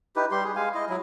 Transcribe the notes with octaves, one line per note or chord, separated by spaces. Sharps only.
D#4 E4 G4 B4
G3 G4 C6
G#4
G#3 F5 G#5
E4 D#5
F#3 E4